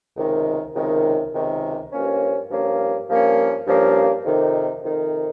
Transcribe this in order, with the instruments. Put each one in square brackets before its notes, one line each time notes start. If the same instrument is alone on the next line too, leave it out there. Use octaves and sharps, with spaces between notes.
[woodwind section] C#2 C3 D#3
C#2 C3 D#3
C#2 C3 D#3
G2 F3 A#3 C#4
G2 F3 A#3 C#4
G2 F3 A#3 C#4
G2 F3 A#3 C#4
F2 C3 D#3
F2 C3 D#3